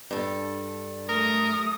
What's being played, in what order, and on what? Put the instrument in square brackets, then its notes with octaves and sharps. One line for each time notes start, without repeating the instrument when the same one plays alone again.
[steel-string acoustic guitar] G2 A4
[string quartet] A3 [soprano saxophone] A#4 [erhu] D#6